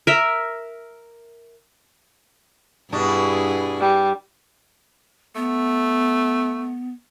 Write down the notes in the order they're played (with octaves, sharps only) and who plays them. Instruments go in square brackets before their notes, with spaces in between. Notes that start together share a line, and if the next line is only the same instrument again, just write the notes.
[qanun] A#4 E5
[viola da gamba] G2 E4 G#4 [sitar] B2 D4
[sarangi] G3
[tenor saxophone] A3 [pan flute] B3